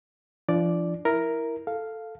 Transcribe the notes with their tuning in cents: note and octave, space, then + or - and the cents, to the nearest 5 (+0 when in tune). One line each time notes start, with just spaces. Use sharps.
F3 -35 D4 +0 D5 +0
E4 +0 A#4 +0
A4 +0 F5 +0